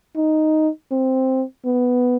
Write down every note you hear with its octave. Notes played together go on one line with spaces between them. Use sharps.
D#4
C4
B3